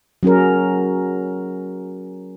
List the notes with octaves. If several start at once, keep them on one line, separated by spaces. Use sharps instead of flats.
F#3 C#4 G#4 A#4